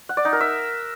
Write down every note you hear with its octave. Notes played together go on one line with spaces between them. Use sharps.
F#5
D5
D#4
A#4
E5